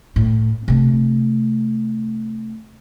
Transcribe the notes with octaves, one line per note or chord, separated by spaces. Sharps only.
A2
C3 A3